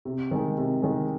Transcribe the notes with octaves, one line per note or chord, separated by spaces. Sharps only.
C3
D#3 G#3
C3
D#3 G#3